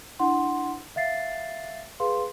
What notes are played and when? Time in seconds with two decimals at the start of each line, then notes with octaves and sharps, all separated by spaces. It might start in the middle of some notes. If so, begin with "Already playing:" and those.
0.19 D4 E4 F#5 C6
0.96 E5 F5 A6 C7
2.00 G#4 B4 F5 C6